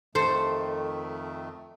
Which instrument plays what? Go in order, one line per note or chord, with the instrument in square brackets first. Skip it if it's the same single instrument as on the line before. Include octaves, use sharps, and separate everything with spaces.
[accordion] F2 D#3 A3 [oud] A4 [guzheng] C5